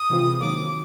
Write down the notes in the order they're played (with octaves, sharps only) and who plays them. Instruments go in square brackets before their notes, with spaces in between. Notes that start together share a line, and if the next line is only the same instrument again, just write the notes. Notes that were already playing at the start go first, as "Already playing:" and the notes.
Already playing: [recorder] D#6
[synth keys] C3 E3 G#3 C4 F4
[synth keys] D#3 F#3 A#3 [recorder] D6